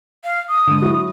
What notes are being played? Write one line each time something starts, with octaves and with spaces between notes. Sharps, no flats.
F5
D#6
G#2 D3
F#3 E4 F#4